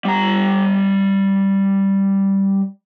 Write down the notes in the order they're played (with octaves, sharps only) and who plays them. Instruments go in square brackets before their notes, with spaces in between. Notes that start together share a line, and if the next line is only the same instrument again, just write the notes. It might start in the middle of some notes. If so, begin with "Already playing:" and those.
[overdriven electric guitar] G3 A#5